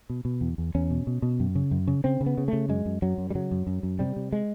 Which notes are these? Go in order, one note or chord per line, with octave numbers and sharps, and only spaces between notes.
B2
B2
E2
E2
E2 C#4
B2
B2
B2
F#2
C#3
F#2
C#3
C#3 C4
C#3
B3
C#3
C#3 A3
F#2 G#3
F#2
F#2 F#3
F#2
G3
C#3 F#3
F#2
F#2
F#2
C3 G3
C3
G#3